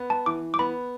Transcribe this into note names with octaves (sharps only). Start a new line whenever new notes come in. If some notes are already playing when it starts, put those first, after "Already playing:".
Already playing: B3
A5
E3 D6
D6
B3 B5